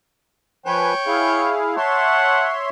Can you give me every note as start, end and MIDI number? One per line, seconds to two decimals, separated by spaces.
0.66 0.93 53
0.66 0.93 71
0.66 1.64 73
0.66 1.64 79
0.66 0.93 80
1.07 1.76 64
1.07 1.76 68
1.07 1.76 77
1.76 2.70 73
1.76 2.70 76
1.76 2.55 78
1.76 2.47 81
1.76 2.70 84